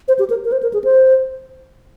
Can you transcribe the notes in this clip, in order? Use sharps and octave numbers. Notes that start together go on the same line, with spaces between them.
C5
G4
A#4
A#4
C5
A#4
G#4
C5